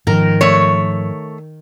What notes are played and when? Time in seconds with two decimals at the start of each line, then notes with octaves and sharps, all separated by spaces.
0.07 G#2 D#3 F3 A#4
0.41 A3 C#5